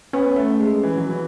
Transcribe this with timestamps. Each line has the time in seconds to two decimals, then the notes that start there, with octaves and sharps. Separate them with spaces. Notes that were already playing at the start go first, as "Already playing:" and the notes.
0.13 B3 C#4
0.36 A3
0.60 G#3
0.83 E3
0.97 F#3
1.10 E3